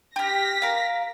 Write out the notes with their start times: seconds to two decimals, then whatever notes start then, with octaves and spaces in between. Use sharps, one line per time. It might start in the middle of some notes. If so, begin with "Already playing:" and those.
0.16 G4 F6 A#6 B6
0.62 A#4 F5